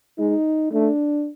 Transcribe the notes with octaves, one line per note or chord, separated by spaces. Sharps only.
G#3 D#4
A3 D4